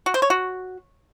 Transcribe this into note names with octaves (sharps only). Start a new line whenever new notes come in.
F#4
C5
C#5
F#4